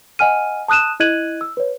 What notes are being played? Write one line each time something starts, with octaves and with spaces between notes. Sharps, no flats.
D#5 F#5 G#5 F6 D#7
A5 D#6 F#6 D#7 E7
E4 D#5 F#6 G#6 D#7 F#7
E6
B4 C#5